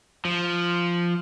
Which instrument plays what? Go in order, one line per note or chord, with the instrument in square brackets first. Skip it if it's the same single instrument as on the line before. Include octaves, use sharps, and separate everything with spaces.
[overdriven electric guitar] F3